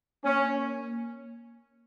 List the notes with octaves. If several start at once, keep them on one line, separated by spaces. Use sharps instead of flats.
A#3 C#4